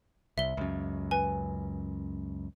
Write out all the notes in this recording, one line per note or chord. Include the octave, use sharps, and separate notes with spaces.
C2 E5 G7
C#2 F#2
B4 G#5